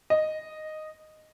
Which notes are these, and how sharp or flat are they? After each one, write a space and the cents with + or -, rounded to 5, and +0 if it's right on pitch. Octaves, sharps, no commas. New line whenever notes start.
D#5 -5